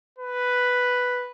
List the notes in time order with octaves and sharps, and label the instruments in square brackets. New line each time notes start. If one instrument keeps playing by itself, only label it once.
[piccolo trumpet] B4